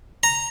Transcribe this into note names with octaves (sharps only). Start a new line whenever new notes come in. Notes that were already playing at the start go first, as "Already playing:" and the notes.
A#5